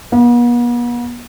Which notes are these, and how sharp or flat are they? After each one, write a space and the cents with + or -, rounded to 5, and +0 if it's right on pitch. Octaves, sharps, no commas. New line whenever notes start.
B3 -45